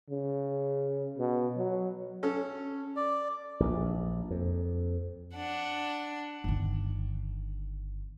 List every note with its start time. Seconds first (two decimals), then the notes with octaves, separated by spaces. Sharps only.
0.10 C#3
1.18 B2
1.57 F#3
2.23 C#4 A4
2.96 D5
3.60 A#1
4.30 F2
5.35 D4 F#5
6.44 G1 D#3